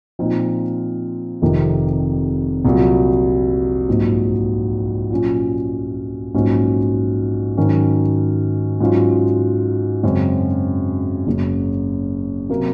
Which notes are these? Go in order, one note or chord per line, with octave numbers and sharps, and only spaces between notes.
A#2 F3 C4 D#4
F1 F2 C3 D#3
C2 A#2 F#3
A#1 G#2 F#3
A#2 F#3 C#4
A#1 G#2 F#3 C#4
G#2 D#3 F#3 C#4
G#2 F#3 C#4 F4
F#2 C#3 G#3 C4
F#1 F#2 C#3
C3 F#3 A#3